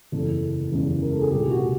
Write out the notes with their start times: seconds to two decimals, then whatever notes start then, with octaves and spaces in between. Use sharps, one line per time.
0.12 F#1 E2 C#3 E3 A4
0.72 F#1 E2 C#3 E3
1.02 A#4
1.12 A4
1.22 G#4
1.31 C2 A#2 G4
1.51 F#4